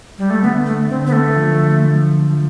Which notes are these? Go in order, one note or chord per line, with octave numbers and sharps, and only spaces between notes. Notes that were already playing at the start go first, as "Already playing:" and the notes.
G3
A3
D3 B3
A3
D3 C4
B3
A3
F3
F3
F3